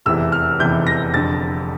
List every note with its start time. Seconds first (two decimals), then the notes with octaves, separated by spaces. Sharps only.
0.06 F1 E2 C3 E3 E6
0.32 F6
0.59 F1 E2 C3 E3 G6
0.87 A#6
1.13 F1 F2 D3 A6